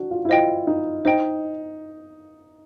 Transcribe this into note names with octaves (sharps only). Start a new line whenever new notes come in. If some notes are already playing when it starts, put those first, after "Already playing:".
Already playing: D4 F#4
F4
E4
F4 C5 D#5 G5
D#4
D#4 C5 D#5 G5